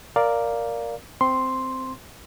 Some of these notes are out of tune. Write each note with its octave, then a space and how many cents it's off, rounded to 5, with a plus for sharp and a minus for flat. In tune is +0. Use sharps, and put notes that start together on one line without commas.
A#4 +0 D5 +0 F5 +0
C4 -5 C6 +0